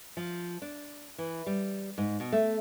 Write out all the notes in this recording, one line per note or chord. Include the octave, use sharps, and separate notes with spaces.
F3
D4
E3
G3
G#2
B2
A3